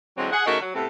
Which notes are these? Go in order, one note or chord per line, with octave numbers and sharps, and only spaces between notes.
D3 E3 F#3 G#3 C4
G#4 F#5
C#3 A3 D#4 F#4 A#4
F#3
A2 C3 A3 B3 C4 A4